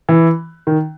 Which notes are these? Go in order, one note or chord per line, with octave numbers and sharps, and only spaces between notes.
E3
D#3